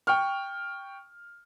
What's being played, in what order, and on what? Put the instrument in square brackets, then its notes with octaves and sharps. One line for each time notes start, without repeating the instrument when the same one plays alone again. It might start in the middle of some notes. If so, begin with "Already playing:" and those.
[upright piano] G5 C#6 F6